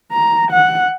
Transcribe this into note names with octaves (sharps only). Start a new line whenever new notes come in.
A#5
F#5